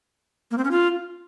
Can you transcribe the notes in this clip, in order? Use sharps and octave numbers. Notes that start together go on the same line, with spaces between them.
A#3
C4
C#4
F4